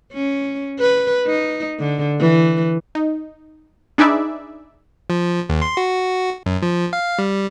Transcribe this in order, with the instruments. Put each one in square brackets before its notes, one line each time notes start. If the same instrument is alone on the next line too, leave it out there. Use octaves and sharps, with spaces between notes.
[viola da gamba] C#4
B4
D#4
D3
E3
[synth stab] D#4
D4 D#4 G#4 B4 D5 E5
[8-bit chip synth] F3
D#2
C6
F#4
F#2
F3
F5
G3